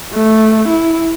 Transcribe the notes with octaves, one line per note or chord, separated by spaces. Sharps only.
A3
E4